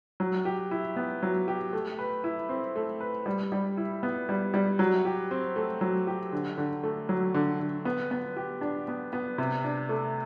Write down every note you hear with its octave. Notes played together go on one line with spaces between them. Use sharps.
F#3
G4
E4
B3
F#3
G4
A3
B4
E4
C4
A3
B4
G3
G3
E4
B3
G3
G3
F#3
G4
C4
A3
F#3
G4
D3
D3
A3
F#3
D3
D3
B3
B3
G4
D4
B3
B3
C3
D4
A3